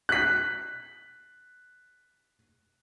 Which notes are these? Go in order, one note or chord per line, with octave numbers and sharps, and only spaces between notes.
F#6 B6